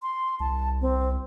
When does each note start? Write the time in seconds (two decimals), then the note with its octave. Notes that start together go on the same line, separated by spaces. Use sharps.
0.02 C6
0.40 C2 A5
0.81 C4